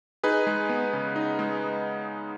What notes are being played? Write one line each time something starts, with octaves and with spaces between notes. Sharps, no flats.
D#4 G#4 B4
G#3
B3
C#3
D#4
G#3